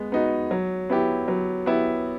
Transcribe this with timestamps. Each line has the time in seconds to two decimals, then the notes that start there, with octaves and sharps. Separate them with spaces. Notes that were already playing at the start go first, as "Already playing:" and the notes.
Already playing: G#3 B3
0.12 B3 D#4 F#4
0.51 F#3
0.90 B3 E4 G4
1.28 F#3
1.66 B3 E4 G4